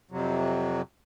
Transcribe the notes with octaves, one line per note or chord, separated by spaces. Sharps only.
F2 C3 F#3